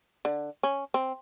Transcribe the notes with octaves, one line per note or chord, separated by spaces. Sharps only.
D3
C#4
C4